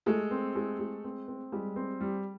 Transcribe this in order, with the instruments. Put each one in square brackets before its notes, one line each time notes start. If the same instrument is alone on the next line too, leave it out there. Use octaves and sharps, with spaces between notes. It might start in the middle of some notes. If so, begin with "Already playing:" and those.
[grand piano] G#3 [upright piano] A3 A4
[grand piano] C4
G#3
G#3
C4
C4
[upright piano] G3 G4 [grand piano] G#3
[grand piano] C4
G3